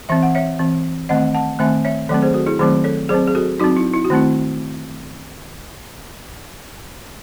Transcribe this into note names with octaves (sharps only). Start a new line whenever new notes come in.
E3 C4 E5
F#5
C#5 E5
E3 C4
D#3 A3 C4 D#5 F#5
F#5 A5
D#3 A3 C4 E5 G#5
C#5 E5
D#3 F#3 A3 C4 A4 C#5
G#4 C5
F#4 A4
E4 G#4
D#3 F#3 A3 C4 G#4 C5
A4 C#5
F#3 C4 G#4 C5
G#4
F#4 A4
F#3 C4 D#4 F#4
E4
E4
F#4
D#3 A3 C4 E4